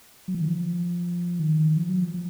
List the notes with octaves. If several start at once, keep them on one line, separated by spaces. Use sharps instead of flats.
F#3
F3
D#3
F3
D#3
F3
F#3
F3
F3